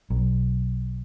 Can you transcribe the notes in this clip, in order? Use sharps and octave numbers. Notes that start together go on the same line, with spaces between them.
B1